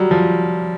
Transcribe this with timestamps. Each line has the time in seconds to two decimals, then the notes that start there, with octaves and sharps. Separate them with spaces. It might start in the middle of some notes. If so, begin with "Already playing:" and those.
Already playing: F#3 G3
0.11 F3